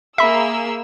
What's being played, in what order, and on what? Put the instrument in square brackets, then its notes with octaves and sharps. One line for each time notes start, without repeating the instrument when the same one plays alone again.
[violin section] A#3 G#4 E6 [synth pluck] E5 B5